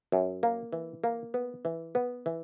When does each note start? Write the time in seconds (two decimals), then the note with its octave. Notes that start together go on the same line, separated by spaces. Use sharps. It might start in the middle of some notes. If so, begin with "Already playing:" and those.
0.12 F#2
0.43 A#3
0.73 E3
1.04 A#3
1.34 B3
1.65 E3
1.95 B3
2.26 E3